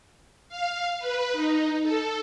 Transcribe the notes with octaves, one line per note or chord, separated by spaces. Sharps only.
F5
B4
D#4
A4